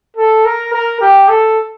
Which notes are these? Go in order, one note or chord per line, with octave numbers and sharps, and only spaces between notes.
A4
A#4
A#4
G4
A4